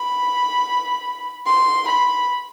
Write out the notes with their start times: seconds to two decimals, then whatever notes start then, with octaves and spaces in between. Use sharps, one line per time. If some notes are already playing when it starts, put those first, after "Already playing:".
Already playing: B5
1.46 C6
1.88 B5